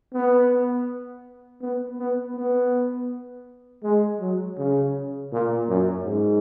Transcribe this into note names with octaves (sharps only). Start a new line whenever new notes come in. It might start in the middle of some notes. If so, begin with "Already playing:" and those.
B3
B3
B3
B3
G#3
F#3
C#3
A#2
F#2
G#2